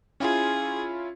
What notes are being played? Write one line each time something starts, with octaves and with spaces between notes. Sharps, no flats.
C#4 E4 F4 G#4